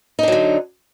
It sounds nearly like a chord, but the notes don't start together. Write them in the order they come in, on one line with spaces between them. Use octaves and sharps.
D#4 D4 F#3 D3